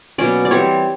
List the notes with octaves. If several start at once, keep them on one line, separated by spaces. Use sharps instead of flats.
B2 F#3 A#3 C#4 D5
D5
E3 G3 C4 C#5